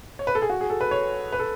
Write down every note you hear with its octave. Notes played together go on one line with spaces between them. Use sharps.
C#5
B4
A4
G#4
F#4
G#4
A4
B4
C#5
B4
A4